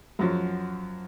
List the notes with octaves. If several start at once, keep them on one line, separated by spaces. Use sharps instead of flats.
F#2 F3 F#3